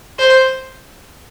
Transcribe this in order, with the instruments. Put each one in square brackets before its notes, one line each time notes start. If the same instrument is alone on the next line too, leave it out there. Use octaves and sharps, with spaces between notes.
[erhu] C5